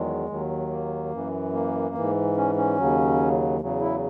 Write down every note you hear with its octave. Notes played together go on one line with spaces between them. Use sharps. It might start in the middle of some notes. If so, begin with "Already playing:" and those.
Already playing: E2 D#3 F#3 G#3
D#2 D#3 F#3
A#3
F#2 E3
A#3
G#2 E3
C#4
C#4
D#2 C#3 F#3
E2 C#3 F#3
E4